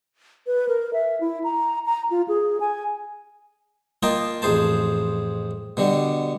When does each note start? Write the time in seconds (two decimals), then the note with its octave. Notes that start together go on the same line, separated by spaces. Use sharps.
0.47 B4
0.69 A#4
0.93 E5
1.21 E4
1.44 A#5
1.86 A#5
2.11 F4
2.28 G#4
2.60 G#5
4.03 A#3 F4 D#5 G5 A5
4.42 A1 F2 G#4 C5 A5
5.77 B2 D3 G3